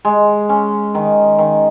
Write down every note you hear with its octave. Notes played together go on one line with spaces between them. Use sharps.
G#3
C#4
D#3
D#3